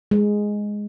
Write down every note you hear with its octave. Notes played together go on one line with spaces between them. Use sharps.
G#3